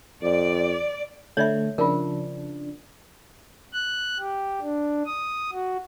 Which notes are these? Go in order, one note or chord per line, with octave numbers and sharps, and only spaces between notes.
F2 D5
D3 A3 C#5 D5 E5
C#3 F3 D4 F4 A#4
F#6
G4
D4
D#6
F#4